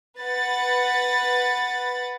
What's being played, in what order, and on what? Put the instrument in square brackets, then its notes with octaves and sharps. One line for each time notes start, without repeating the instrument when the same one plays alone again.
[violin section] B4 F#5 B5 A6